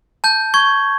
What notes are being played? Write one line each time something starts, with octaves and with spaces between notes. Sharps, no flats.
A5 G6
C#6 G#6